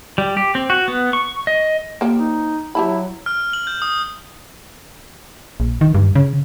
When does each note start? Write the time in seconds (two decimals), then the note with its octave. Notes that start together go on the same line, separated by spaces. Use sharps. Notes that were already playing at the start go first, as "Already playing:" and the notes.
0.18 G3
0.37 G4
0.55 C4
0.70 F#4
0.88 B3
1.13 C#6
1.47 D#5
2.01 F3 G3 A#3
2.18 D#4
2.75 F#3 E4 G4 A5 B5
3.26 F6
3.53 F#7
3.67 G6
3.82 D#6
5.60 A#1
5.81 D#3
5.94 G2
6.15 C#3